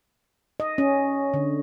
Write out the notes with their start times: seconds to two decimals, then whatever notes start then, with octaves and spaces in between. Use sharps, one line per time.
0.60 D#5
0.78 C#4
1.34 D3